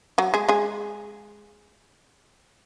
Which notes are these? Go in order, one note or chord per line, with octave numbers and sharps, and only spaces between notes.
F#3 F#4
G#3 G#4
G#3 G#4